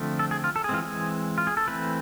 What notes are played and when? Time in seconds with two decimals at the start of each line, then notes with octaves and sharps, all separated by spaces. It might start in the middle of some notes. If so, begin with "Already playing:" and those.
Already playing: D3 F3 A3 C4
0.19 A4
0.31 G#4
0.44 F4
0.56 A4
0.64 G#4
0.69 E3 G#3 C4 F4
0.82 G#4
1.38 F4
1.47 G#4
1.57 A4
1.68 E3 A3 C4 B4